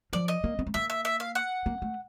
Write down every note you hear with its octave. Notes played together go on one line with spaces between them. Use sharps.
F3 D5
D#5
A#3
B3
A3
A#3 E5
E5
E5
F5
F#5
A#3
A3